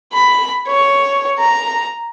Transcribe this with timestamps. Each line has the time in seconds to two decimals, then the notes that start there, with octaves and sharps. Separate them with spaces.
0.13 B5
0.68 C#5
1.39 A#5